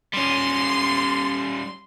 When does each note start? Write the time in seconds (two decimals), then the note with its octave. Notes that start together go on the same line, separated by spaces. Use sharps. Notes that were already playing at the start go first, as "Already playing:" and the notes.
0.14 G3 C#4 C6